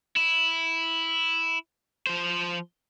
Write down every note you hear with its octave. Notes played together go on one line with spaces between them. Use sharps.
E4
F3 C5